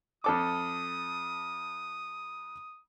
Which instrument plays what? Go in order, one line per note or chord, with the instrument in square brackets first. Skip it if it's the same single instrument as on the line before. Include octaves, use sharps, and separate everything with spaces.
[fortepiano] F2 A4 D6 [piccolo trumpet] D#6